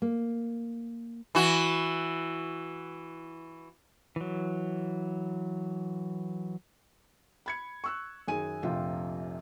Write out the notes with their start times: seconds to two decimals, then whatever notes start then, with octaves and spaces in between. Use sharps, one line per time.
0.02 A#3
1.35 E3 F#4
4.16 E3 F#3
7.46 B5 G#6 C#7
7.84 C#6 E6 F#6
8.28 F#2 D#3 G#4 G#5 D#7
8.63 F1 A#1 C3 F4 G5